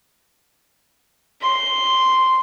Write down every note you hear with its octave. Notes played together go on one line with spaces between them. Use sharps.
C6